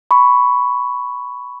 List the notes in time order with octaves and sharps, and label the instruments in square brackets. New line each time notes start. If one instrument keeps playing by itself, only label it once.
[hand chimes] B5 C#6